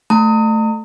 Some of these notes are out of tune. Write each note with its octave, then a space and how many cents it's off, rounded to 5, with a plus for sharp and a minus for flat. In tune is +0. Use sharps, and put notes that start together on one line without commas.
A3 +0 A#5 -35